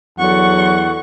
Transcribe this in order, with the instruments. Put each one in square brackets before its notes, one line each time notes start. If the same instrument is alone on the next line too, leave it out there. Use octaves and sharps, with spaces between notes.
[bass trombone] E2 [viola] D3 C#6 [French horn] F#3 [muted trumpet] F#5